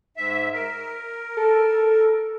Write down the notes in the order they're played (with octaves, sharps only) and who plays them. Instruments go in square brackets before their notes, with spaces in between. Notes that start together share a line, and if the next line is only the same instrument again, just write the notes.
[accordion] G#2 E5
A#4
[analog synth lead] A4